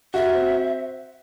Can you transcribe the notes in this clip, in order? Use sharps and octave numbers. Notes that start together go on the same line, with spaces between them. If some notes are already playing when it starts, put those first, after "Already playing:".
F#4 E5
C4